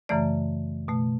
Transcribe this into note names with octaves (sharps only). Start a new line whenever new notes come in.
F#2 C#3 E3 A3 D5
B2 A3